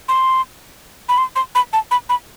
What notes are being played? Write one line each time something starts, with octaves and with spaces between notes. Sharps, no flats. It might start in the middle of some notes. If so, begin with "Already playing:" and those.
C6
B5
C6
C6
B5
A5
B5
B5